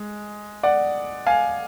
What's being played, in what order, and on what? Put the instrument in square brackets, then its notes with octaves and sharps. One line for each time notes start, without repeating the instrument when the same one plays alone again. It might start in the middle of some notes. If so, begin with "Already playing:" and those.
Already playing: [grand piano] G#3
D5 F#5
F5 G#5